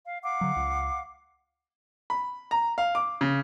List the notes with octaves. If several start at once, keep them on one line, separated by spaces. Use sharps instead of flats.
F5
F5 F#5 D6
D3 F#3
C#2
B5
A#5
F5
D6
C#3